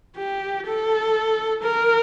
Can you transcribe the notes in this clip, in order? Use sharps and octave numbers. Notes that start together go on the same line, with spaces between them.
G4
A4
A#4